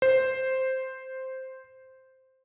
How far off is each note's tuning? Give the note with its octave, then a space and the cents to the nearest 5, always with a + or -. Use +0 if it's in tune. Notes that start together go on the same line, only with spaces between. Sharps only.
C5 +0